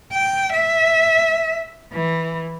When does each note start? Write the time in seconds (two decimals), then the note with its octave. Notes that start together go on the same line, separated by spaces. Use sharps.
0.13 G5
0.52 E5
1.92 E3